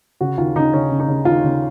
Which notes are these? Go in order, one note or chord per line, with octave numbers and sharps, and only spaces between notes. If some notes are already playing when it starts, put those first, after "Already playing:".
C#3 F#4
D#2 F4
C#3 D#4
C#3 C#4
C#3
D#4
C#3
D#2 F4
C#3